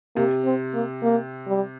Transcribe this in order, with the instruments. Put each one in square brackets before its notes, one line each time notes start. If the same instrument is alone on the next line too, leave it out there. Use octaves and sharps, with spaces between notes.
[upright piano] C3 [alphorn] A#3
[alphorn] C4
A#3
A#3
G3